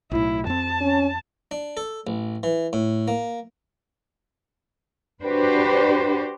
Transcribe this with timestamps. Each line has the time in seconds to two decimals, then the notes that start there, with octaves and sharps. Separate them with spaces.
0.11 B1 A2 E4
0.47 F2 C4 A5
0.81 C#4
1.51 D4
1.77 A4
2.07 A1
2.43 E3
2.73 A2
3.08 A#3
5.24 D4 F#4 G4 B4 C5